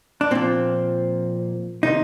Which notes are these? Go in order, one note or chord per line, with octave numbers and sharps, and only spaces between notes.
D4
A#2 F3 C4
C3 D#3 D#4